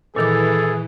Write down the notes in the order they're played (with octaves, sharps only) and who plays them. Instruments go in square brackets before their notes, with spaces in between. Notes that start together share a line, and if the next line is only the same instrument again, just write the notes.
[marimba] A#2 D#3 D6 [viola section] E3 [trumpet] G#4 [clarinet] A4